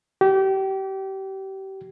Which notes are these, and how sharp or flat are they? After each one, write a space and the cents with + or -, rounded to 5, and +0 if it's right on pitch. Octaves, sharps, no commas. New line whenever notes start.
G4 -30